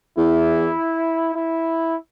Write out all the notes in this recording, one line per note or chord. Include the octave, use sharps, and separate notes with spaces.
E2 E4
E4